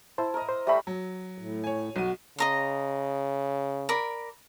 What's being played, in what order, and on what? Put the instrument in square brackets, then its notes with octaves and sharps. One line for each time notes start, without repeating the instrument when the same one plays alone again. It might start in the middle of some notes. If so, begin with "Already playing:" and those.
[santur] E4 [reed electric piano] C5 A5
[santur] A#4 D#5
[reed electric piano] C5
[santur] G3 A3 B5 [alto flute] E5
[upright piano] F#3
[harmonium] A2
[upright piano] C#5 G#5
[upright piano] B1 D#7 [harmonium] F#4
[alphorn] C#3 [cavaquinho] D#5 A#5 C6
[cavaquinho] A#4 D5 B5